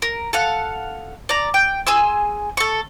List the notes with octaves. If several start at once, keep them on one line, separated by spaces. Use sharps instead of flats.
A#4
A4 F5 F#5
D5 A#5
G5
G#4 G#5 C6 E6
A4 C#6